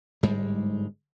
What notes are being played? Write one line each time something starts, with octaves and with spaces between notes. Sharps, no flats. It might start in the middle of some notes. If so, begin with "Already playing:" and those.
G1 G#2 G3 G#3